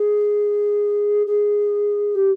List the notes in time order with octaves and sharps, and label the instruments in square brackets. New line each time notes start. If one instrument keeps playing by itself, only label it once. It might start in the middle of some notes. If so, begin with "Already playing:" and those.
Already playing: [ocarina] G#4
G#4
G4